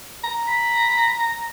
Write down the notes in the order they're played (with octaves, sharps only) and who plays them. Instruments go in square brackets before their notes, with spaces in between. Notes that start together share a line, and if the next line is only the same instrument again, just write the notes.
[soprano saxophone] A#5
[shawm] B5